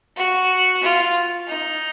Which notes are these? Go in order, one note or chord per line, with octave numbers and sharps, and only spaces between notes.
F#4
F4
D#4